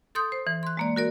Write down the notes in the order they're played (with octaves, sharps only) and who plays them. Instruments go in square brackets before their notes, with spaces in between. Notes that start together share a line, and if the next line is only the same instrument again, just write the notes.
[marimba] A4 C6 D#6 G6
C5
E3
C6 F#6
G#3 A#3 D5
F#4 A#4 D5